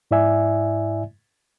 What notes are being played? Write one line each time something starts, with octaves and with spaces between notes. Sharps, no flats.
G#2 E4 D5 E5 G#5